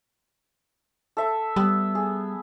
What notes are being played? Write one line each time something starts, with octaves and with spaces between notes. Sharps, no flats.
A4 E5
G3 B3
G#4